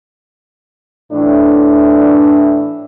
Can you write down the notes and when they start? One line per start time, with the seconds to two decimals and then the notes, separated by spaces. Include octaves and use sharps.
1.12 A2 E3 D4